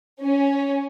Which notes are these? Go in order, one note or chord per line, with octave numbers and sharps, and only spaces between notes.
C#4